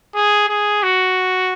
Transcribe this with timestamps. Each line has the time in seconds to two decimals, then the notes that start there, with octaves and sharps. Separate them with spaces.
0.15 G#4
0.48 G#4
0.83 F#4